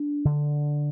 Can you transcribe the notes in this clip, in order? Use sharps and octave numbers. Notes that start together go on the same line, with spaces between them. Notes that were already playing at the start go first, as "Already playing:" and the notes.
Already playing: D4
D3